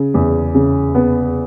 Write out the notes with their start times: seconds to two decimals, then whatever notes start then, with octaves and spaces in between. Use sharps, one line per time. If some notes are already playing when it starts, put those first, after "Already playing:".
Already playing: C#3
0.14 E2
0.55 C#3
0.95 B3